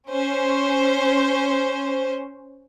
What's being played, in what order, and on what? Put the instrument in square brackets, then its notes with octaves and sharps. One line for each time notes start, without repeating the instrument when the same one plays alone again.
[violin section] C#4 C5